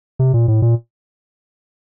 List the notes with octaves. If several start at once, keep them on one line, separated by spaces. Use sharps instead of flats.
C3
A#2
A2
A#2